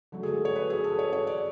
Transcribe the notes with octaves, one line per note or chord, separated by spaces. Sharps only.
D3 F#3 A3
G#4
A4
C#5
B4
G#4
A4
C#5
C#5
D5